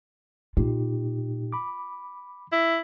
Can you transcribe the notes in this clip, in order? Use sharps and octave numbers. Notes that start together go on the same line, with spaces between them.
A#2 D#4 F4 G4
B5 D6
E4